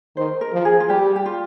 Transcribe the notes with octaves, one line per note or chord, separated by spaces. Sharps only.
D#3 C5
A#4
F3
G#4
F4
G3 G4
G4
F4